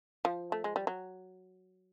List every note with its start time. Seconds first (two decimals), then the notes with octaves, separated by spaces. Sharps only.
0.25 F3
0.52 A3
0.64 G#3
0.76 G3
0.87 F#3